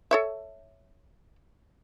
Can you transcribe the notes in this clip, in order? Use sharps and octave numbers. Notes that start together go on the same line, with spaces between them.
A4 C#5 E5